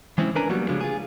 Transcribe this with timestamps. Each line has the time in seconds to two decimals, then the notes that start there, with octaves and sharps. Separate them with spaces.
0.18 E3 G#3 C4 C#4 E4
0.35 C#4 D4 A#4 B4 G#5 A#5
0.50 F#3 G3 A#3 B3 F#4
0.69 C#3 F3 G3 G#3 D4
0.81 F4 G#4